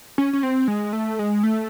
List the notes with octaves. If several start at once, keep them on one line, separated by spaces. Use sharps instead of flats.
C#4
C#4
C4
G#3
A3
G#3
A3